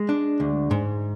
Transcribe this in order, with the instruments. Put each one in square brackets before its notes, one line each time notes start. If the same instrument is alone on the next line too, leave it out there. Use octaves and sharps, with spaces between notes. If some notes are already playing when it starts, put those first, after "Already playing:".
Already playing: [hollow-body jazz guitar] G#3
D4
D2
G#2